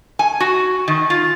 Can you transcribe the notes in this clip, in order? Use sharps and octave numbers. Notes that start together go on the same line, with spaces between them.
G#5
F#4
D#3
F4